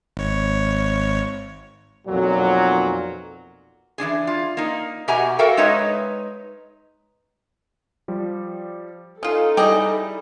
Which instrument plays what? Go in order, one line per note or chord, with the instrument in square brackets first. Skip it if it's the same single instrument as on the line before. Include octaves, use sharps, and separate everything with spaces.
[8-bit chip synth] G#1 C#5
[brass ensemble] B1 F2 A#2 F#3
[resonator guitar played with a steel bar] E3 F3 D4 G#4
F4
A#3 D#4
B2 F#4 G4 E5 G#5 A#5
F#4 A4 A#4 E5 F5 G5
G#3 D#4 B4 C#5 D#5 E5
[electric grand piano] F3 G3
[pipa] C#4 F4 [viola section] D#4 A4 [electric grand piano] D#6
[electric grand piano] G3 E4 [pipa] G4 G#4 D#5